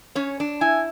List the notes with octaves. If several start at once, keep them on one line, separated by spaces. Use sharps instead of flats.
C#4 C#5
D4
E4 G#5